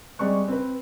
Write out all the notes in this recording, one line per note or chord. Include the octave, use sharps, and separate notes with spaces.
G3 G#3 C4 C#6 F#6
C4 B4